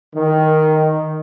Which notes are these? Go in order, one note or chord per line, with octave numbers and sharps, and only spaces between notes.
D#3